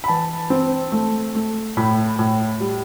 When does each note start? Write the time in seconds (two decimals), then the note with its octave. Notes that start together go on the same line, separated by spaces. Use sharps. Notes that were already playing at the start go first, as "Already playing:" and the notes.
0.04 B5
0.08 E3 A5
0.50 C4
0.92 A3
1.35 A3
1.77 A2 B5
2.19 A2
2.60 G3